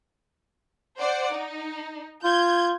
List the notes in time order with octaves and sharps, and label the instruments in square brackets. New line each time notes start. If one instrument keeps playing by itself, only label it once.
[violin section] C5 D5 F#5
D#4
[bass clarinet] F4 [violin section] G6 G#6